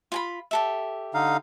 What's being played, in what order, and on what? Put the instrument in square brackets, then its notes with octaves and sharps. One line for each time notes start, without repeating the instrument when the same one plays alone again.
[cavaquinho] F4 G#5 B5
G4 A4 E5
[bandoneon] D3 D#4 F5